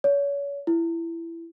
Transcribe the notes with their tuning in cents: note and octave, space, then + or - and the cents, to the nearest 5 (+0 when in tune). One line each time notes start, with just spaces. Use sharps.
C#5 +30
E4 +20